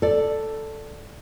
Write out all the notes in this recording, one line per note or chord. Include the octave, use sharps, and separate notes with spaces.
A4 D5